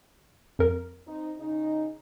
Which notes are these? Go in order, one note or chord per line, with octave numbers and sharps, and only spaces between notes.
F2 A#4
C4 D#4
C#3 D#4